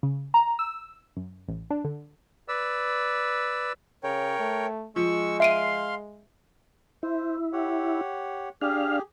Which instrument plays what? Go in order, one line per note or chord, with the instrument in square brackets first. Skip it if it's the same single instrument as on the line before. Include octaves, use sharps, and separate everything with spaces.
[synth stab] C#3
A#5
E6
F#2
A1
D4
D3
[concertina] B4 D5 E6
[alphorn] C#3 [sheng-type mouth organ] A#4 C#5 G5
[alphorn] A3
[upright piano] F3 [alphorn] G#3 [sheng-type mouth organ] C#6 E6
[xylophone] E5 D7 D#7 [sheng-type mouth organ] F5 C6
[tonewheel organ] E4 [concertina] C5
[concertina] G4 C#5 F#5
[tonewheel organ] D4 F5 [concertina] G4 G#4